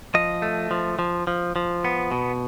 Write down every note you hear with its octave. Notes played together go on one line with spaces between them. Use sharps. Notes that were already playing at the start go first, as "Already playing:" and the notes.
F3 D#5
A3
F3
F3
F3
F3
B3
B2